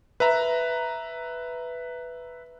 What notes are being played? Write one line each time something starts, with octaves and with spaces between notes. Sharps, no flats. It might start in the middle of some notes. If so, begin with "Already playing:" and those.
B4 E5 A#5